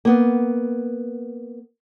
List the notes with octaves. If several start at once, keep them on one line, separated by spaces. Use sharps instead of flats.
A#3 B3